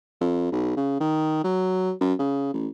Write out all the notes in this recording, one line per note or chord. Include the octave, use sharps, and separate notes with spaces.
F2
B1
C#3
D#3
F#3
F#2
C#3
A1